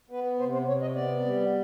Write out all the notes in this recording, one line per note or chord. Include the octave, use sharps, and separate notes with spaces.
B3 B4
C3 C5
C5
C3 C#5
D#5
B3 D5
G3